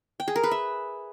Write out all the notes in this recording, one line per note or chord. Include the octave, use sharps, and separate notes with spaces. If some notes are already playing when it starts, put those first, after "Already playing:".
G5
G#4
A#4
B4
E5